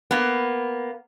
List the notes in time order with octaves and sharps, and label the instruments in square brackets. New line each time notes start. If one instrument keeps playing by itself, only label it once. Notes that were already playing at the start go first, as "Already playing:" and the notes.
[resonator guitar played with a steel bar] A#3 B3